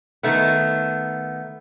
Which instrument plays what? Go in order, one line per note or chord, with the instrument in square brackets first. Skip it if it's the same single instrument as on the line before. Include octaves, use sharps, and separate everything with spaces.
[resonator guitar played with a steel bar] D#3 A3 B3